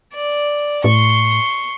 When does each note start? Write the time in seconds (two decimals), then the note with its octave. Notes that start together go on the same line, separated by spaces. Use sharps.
0.14 D5
0.84 A2 C6 C#6